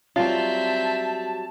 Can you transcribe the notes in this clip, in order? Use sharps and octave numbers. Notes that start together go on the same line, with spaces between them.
F#3 G3 C4 F4 E5 A5